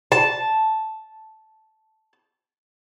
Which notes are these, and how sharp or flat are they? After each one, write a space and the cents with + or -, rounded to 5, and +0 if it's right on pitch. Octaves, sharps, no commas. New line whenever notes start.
A5 -5